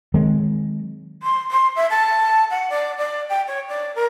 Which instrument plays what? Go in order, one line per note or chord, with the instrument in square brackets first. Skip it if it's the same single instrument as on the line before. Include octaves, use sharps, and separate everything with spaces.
[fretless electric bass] D#3 F#3 G#3 C4
[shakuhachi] C6
C6
E5
A5
F#5
D5
D5
G5
C#5
D5
A#4